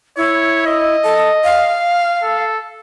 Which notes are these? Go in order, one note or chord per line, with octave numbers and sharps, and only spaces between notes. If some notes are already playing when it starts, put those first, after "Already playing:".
E4 C#5
D#5
A4
F5
A4